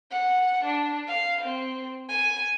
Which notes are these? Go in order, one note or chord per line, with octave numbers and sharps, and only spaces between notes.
F#5
D4
F5
C4
G#5